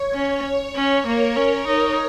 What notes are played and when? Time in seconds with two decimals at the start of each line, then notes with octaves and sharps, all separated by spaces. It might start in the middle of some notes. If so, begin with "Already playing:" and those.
Already playing: C#5
0.14 C#4
0.45 C#5
0.76 C#4
1.06 A#3 A#4
1.37 C#4
1.67 D#4